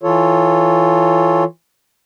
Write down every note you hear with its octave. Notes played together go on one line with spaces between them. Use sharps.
E3 F4 A4 C#5